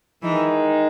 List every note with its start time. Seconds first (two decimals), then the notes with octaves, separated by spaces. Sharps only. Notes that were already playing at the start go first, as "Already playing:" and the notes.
0.22 D#3 E3 G#3 D#4